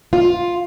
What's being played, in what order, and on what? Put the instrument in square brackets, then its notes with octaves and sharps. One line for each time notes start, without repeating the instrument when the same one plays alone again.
[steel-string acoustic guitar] F4